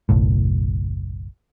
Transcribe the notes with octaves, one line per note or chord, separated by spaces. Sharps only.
F#1 B1 A2